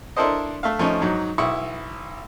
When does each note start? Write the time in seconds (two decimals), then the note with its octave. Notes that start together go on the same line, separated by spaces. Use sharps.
0.17 D4 E4 A4 A#4 C5 D#5
0.63 A3 E5 F5
0.79 F3 A3 C#4 D#4
1.01 G#2 F#3 D#4
1.38 B1 E4 C#6 D#6